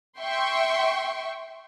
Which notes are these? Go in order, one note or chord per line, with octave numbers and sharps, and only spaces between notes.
E5 G5 C6 C#6